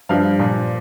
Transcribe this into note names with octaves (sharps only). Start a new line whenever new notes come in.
G2 F3 F5
A#2 F3